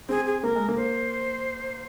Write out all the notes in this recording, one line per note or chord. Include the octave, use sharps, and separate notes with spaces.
C4 G#4
G#4
A#3 A#4
G#3
A#3
C5